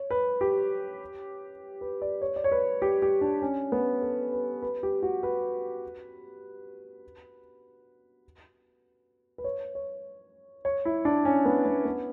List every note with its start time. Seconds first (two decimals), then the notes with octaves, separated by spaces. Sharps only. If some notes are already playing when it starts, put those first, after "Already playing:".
Already playing: C#5
0.11 B4
0.41 G4
1.81 B4
2.02 D5
2.22 C#5
2.36 D5
2.44 C#5
2.52 B4
2.82 G4
3.02 G4
3.21 D4
3.42 C#4
3.72 B3
4.02 A4
4.32 B4
4.62 B4
4.83 G4
5.03 F#4
5.23 B4
9.38 B4
9.44 C#5
9.75 C#5
10.65 C#5
10.85 E4
11.05 D4
11.25 C#4
11.45 B3
11.65 B3
11.85 B3